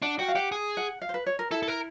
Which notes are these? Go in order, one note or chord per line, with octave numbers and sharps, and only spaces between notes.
D4 F#5
F#4 G5
F5
G4 F#5
G#4
F#5
F5
C5
B4
C#5
A#4
E4 A4
A4
A#4